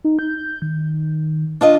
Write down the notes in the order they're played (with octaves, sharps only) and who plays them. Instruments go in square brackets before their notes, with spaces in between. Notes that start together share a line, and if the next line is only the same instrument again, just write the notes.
[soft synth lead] D#4
G6
D#3
[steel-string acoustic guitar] D4 F4 D#5